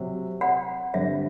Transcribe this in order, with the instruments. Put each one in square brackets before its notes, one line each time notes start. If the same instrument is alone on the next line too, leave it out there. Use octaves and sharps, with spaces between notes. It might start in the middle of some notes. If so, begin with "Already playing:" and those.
Already playing: [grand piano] C3 F#3
[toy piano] F#5
[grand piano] G2 D3 G3 C4 [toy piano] E5